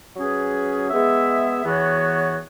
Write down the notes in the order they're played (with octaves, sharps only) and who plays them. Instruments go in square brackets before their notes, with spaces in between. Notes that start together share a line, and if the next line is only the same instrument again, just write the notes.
[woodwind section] F#3 C#4 G#4 B4
G#3 B3 G#4 E5
E2 E3 B3 F#4 C#5